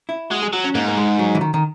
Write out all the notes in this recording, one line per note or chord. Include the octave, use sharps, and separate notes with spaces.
E4
G#3 F#4
G#4
F#3 F#4
C#4
G#2 A#3
A#3
G#3
F#3
E3
D#3
D#3